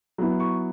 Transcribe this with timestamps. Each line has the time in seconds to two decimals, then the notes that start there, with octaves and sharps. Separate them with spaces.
0.18 F#3 B3 E4
0.40 C#6